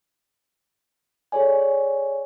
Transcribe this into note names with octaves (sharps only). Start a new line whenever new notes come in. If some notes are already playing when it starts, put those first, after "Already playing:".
G#4 A4 C#5 D5 G#5